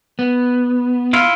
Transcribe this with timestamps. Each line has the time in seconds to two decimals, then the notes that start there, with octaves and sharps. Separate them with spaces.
0.19 B3
1.13 E4 F4